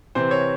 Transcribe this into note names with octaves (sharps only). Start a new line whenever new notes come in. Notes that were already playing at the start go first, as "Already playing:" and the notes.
C3 E3 C4 C5
C#5